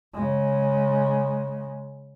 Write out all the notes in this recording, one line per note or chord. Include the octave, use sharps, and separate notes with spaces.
C#3 G#3